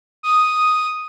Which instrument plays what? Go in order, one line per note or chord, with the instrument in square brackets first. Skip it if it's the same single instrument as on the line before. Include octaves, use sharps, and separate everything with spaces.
[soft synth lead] D#6